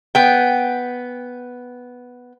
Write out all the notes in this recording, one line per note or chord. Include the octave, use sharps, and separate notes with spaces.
B3 G5